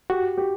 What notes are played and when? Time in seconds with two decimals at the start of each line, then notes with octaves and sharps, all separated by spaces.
0.10 F#4 G4
0.37 G4